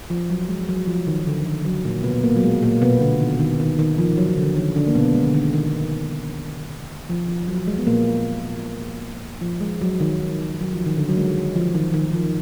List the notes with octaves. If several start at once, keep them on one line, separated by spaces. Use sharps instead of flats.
F3
F#3
G#3
F#3
F3
D#3
D3
D#3
F#3
A#2 A#3
B2 B3
A#2 A#3
F#3
G#3
A#2 A#3
B2 B3
D3
D#3
D#3
D#3
D#3
F3
F#3
D3
D#3
D3 D4
A#3
B2 B3
G#3
D3
D#3
D#3
F3
F3
F#3
G#3
B3
A#2 A#3
F3
G#3
F#3
D#3
F#3
F3
D#3
D3
F#3
G#3
F3
D#3
D#3
F3